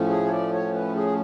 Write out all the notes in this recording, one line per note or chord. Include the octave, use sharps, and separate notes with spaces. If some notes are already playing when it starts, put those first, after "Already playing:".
Already playing: A2 F3 A3 C#4
G#4
C#5
D5
C#5
B4
G#4